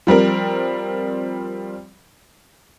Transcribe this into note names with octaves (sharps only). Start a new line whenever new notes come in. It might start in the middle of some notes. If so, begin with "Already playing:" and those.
F3 G3 C4 A#4